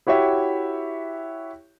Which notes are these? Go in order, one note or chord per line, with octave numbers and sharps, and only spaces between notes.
E4 F#4 G4 C#5 E5